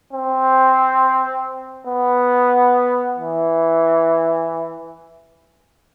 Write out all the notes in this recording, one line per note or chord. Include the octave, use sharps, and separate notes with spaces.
C4
B3
E3